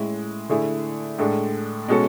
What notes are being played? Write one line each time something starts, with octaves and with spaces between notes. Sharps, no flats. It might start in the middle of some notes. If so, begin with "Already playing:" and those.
Already playing: A2 G#3 C#4 E4
D3 A3 E4 G#4
A2 G#3 D4 A4
B2 G#3 C#4 F#4 A4